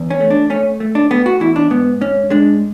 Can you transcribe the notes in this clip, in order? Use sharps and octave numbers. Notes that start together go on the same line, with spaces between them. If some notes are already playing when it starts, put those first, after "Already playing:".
Already playing: E2
C#4
A3
D4
A3 C#4
A3
D4
A3 B3
F#4
E2 E4
D4
G#2 B3
G#2 C#4
G#3 D4